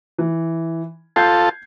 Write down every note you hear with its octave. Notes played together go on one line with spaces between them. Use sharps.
E3
F4 A4 G6 G#6 C7